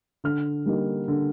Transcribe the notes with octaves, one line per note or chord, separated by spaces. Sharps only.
D3 F6
G3 A#3 D#4
D3